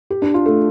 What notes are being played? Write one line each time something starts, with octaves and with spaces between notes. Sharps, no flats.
G4
D4
F4
A3